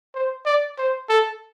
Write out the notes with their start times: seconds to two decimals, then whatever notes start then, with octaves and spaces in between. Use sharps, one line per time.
0.14 C5
0.46 D5
0.78 C5
1.09 A4